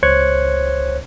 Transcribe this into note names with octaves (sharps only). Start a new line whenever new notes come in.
C#2 C5 C#5 F#6 G#6 C#7